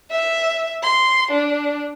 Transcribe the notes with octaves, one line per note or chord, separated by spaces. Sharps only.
E5
C6
D4